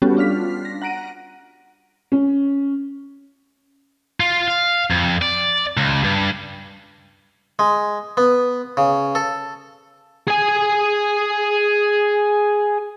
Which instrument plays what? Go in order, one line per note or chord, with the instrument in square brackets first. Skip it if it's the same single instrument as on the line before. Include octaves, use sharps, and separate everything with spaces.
[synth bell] G3 B3 C#4 F#4 G4 A4
D4 F4 F6 B6
A#6
F#5 A#5 A#6 D7 D#7
[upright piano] C#4
[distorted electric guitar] F4
F5
F2
D5
C#2
G2
[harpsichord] G#3
B3
C#3
A4
[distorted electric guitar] G#4 G#5